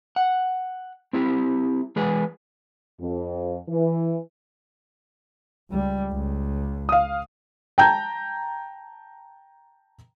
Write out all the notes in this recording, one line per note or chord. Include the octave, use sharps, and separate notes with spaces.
F#5
C4 E4 G4
E3 G#3 G#4 B4
F2
E3
C#2 G3
C#2
F5 D#6
G5 A5 A#5 G6